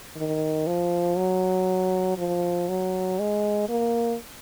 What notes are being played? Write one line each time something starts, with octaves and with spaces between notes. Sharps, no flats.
D#3
F3
F#3
F3
F#3
G#3
A#3